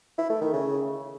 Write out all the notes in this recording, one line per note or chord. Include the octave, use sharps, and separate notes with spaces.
E4
A3
D#3
C#3